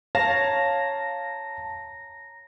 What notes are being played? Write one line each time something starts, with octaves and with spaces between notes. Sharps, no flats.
C#5 F5 A5 A#5 A#6